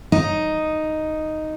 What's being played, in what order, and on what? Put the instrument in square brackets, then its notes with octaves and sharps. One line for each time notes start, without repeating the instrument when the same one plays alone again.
[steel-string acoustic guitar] D#4